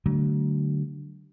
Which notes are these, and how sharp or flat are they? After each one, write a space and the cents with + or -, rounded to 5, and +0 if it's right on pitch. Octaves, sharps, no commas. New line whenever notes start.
D3 +0 F#3 +35 A3 +0